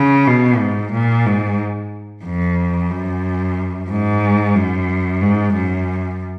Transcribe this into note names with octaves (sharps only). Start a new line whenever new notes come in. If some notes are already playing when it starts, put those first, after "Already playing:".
Already playing: C#3
B2
G#2
A#2
G#2
F2
F#2
G#2
F#2
G#2
F#2